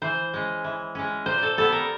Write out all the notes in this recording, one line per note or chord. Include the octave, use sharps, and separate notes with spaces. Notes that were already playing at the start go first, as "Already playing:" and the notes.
E3 C5
G#3 C#4
E3
G#3 C#4
A#2 C5
A4
G3 B3 A4
A#4